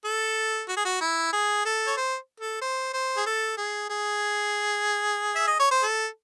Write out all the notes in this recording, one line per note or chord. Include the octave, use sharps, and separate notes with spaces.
A4
F#4
G#4
F#4
E4
G#4
A4
C#5
C5
A4
C5
C5
G#4
A4
G#4
G#4
E5
D#5
C#5
C5
A4